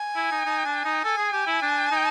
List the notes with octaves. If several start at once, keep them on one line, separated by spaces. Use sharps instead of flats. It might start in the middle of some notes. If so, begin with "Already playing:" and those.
Already playing: G#5
E4
D#4
D#4
D4
D#4
A4 G#5
G#4
G4
E4
D4
D#4